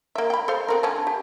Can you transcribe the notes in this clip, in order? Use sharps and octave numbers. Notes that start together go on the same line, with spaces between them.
A#3 E5
G5 B5
A4 C5 F5
B3 C4 A#4
D3 C#4 A5
G4